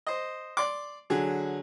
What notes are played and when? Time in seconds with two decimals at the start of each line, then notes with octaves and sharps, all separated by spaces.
0.07 C5 D#5
0.57 D5 C6 D6
1.10 D3 F#3 G#4